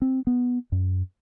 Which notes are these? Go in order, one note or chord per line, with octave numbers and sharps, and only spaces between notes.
C4
B3
F#2